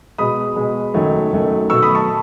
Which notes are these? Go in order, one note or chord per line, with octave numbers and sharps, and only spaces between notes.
B2 G#3 B5 D#6
B2 G#3
F#2 D#3 F#3 A3
F#2 D#3 F#3 A3
B2 F#3 A3 C#6 E6
B5 D#6
A5 C#6